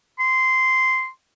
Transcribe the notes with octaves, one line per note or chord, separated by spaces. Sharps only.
C6